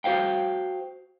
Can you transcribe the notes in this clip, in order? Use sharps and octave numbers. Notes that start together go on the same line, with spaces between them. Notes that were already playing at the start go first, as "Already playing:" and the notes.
F#4 C5 F5 G5